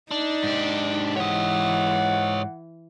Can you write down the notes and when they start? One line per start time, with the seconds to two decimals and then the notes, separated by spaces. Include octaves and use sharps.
0.11 D4 D#4
0.44 G#2 G4
1.17 E3 C#5 D#5 F#5